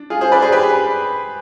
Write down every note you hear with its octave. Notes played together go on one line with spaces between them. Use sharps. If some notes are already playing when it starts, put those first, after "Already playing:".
Already playing: D4
F4 G#4
G#4 C5
B4 D5
G#4 C5
G4 B4